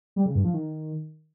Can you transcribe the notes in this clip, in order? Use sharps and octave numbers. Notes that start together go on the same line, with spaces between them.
G3
C#3
G2
F3
D#3